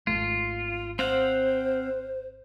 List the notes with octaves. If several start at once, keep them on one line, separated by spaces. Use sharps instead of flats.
G#1 C#2 A3 F4
C4 C5 F5 F#5